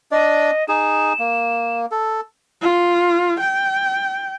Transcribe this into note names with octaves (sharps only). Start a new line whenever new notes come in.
D4 D5 D#5
D#4 G#4 E7
A#3
A4
F4
G5